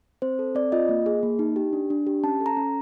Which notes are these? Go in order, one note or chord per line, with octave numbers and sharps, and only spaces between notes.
C4 C5
A4
C4 D5
F4 D#5
A#3
G#4
A#3
D#4
G4
D4
D4
G4
C#4 A5
A4
A#5
C#4